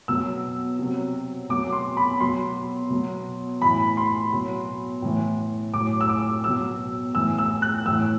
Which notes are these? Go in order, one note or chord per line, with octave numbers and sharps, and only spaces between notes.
B2 F#3 E6
C3 F#3
B2 F#3 D6
C6
B5
B2 F#3 C6
B2 F#3
A2 E3 B5
C6
B2 F#3
A2 E3
A2 F#3 D6
E6
D6
B2 F#3 E6
A2 E3 E6
E6
F#6
A2 E3 E6